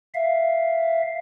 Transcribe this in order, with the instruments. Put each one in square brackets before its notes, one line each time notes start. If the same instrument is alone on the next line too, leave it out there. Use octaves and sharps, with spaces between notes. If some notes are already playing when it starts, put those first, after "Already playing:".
[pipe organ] E5 F5